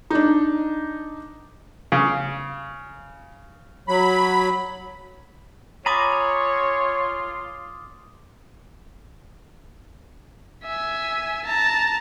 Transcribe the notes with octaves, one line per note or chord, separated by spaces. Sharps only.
D4 D#4
C#3
F#3 B5
F4 C#5 G#5 A#5 B5 D6 D#6 A6
E5 G#5
A5 A#5